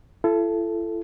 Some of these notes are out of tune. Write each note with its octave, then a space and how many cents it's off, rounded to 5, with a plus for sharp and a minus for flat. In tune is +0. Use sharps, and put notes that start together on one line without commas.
E4 +40 A4 -5